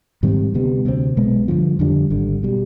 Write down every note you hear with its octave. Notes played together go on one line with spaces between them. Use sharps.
G#2 D#3 G3 C4
D2 C3 G3 B3
D2 C3 G3 C4
B1 B2 G#3 B3
G2 D3 F3
F2 D3 G3 D4
G#1 G2 D3
B2 G3